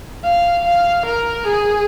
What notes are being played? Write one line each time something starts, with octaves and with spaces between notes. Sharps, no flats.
F5
F5
A#4
G#4